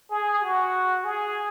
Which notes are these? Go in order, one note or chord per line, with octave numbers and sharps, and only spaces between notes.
G#4
F#4
G#4